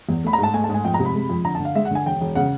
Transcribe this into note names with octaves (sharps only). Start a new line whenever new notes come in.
E2
A3 B5
A#5
G#2 A5
A3 G#5
A5
G#2
G#5
F2 G5
A#5
C3
B5
G#3
F2
D3 A#5
A5
D3
F5
G#3 E5
F#5
D3 G#5
E1 G5
E1
C#3 F#5